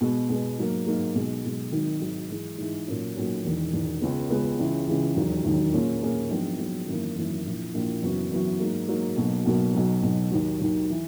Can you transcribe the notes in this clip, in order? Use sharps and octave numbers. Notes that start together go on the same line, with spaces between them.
B2 G#3 B3
B2 G#3 B3
G#2 F#3 A#3
G#2 F#3 A#3
B1 B2 G#3
B1 B2 G#3
G#1 G#2 D#3 F#3
G#1 G#2 D#3 F#3
G#2 E3 G#3
G#2 E3 G#3
B1 A#2 A#3 C#4 F#4
B1 A#2 A#3 C#4 F#4
E1 E2 D#3
E1 E2 D#3
C#2 C#3 G#3 B3
C#2 C#3 G#3 B3
C#2 C#3 E3
C#2 C#3 E3
E1 D#2 D#3 F#3
E1 D#2 D#3 F#3
A#2 A#3 C#4 G#4
A#2 A#3 C#4 G#4
A#1 G#2 F#3 B3
A#1 G#2 F#3 B3
G#1 F#2 E3 A#3
G#1 F#2 E3 A#3
A#1 A#2 A#3 E4
A#1 A#2 A#3 E4
F#1 F#2 E3 B3 F#4
F#1 F#2 E3 B3 F#4
G#2 F#3 A#3
G#2 F#3 A#3
B1 B2 F#3 A#3
B1 B2 F#3 A#3
B1 B2 F#3
B1 B2 F#3
D#2 D#3 F#3
D#2 D#3 F#3
E3